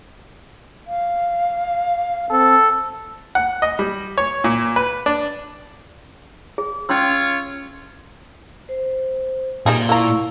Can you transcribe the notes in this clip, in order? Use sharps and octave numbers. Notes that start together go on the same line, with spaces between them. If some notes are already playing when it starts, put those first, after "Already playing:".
F5
C4 A4
F#5
D#5
G3
C#5
A#2
B4
D4
G#4
C#4 F4 C#5 C6 E6
C5
A#2 G3 D#4 G#4
A#3 E4 A#5 C#6 E6